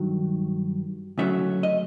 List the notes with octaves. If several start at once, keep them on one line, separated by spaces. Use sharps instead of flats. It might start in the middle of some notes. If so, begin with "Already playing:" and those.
Already playing: G2 D#3 F#3
D2 C#3 F#3 A3 E5
D#5